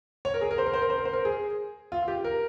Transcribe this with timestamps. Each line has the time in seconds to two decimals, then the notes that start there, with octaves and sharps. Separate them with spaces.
0.25 C#5
0.34 A#4
0.41 G#4
0.51 A#4
0.58 C5
0.66 A#4
0.74 C5
0.82 A#4
0.90 C5
0.98 A#4
1.05 C5
1.13 A#4
1.25 G#4
1.92 F4
2.03 F4
2.08 G4
2.25 A#4